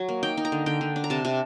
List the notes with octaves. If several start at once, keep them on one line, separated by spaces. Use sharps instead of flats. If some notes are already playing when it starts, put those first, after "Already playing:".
Already playing: F#3
A#3
D#4 G5
D#4
A#5
D3
D3 G5
D3
D4
A#5
C3 A5
C3